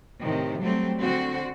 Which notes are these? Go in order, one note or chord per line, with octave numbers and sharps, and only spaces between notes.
A2 C3 D#3
F#3 G3 A3 C4
D3 C4 F#4